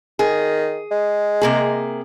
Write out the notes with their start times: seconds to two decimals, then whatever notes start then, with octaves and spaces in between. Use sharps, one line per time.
0.19 D#3 G#4
0.91 G#3
1.41 C3 A#3 G#4